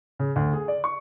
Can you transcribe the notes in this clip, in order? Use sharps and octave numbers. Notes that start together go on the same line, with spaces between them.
C#3
D2
G#4
D5
C#6